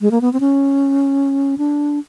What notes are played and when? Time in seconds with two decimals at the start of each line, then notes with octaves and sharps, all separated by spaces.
0.01 G#3
0.11 A#3
0.21 B3
0.33 C4
0.40 C#4
1.58 D4